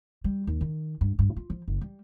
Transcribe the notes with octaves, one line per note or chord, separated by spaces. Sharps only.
G3
D#2
D#3
G2
G2
F4
F3
F#1
G3